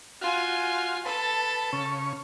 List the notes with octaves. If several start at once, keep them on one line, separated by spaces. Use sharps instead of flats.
F4 F#4 G#5 F6
A4 B4 A5
C#3 C#4 C#6